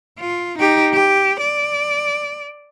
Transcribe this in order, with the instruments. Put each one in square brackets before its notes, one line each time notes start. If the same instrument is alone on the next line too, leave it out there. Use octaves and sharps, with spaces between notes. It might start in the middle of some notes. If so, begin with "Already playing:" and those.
[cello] F4
D#4 G4
G4
D5